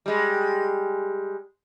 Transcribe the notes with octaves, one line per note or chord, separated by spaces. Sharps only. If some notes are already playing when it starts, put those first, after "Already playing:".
G3 G#3